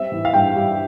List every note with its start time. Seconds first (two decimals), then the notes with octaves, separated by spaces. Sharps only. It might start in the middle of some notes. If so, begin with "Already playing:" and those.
Already playing: G3 C4 E5
0.12 E3
0.25 F5
0.33 G2 G5
0.56 G3